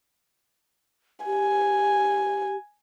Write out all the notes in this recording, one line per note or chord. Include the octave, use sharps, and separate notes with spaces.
G4 G#5